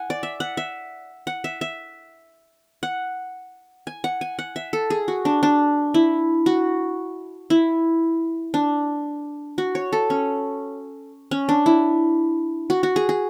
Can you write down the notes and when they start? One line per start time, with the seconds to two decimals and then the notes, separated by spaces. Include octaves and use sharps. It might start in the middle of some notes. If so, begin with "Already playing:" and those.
Already playing: F#5 G#5
0.10 D5
0.23 E5
0.40 F#5
0.57 E5
1.27 F#5
1.44 E5
1.61 E5
2.83 F#5
3.87 G#5
4.04 F#5
4.21 G#5
4.39 F#5
4.56 E5
4.73 A4
4.90 G#4
5.08 F#4
5.25 D4
5.43 D4
5.94 E4
6.46 F#4
7.50 E4
8.54 D4
9.58 F#4
9.75 C#5
9.93 A4
10.10 C#4
11.31 C#4
11.49 D4
11.66 E4
12.70 F#4
12.83 F#4
12.96 G#4
13.09 G#4